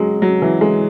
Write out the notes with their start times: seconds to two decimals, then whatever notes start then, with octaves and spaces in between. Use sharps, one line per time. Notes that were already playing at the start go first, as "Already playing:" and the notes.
Already playing: F#3 G#3
0.22 F#3
0.42 E3
0.61 G#3